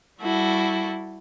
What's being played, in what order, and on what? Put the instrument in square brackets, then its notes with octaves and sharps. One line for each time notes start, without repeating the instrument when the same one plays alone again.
[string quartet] G3 E4 F#4 A4